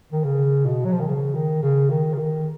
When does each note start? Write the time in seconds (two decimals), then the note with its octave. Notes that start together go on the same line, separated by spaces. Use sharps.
0.13 D#3
0.24 C#3
0.66 B2
0.85 F#3
0.93 F3
1.00 D#3
1.08 C#3
1.35 D#3
1.63 C#3
1.90 D#3
2.13 C#3
2.18 D#3